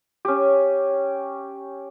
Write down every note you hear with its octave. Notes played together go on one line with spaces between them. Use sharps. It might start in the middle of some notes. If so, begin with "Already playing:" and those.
C#4 G4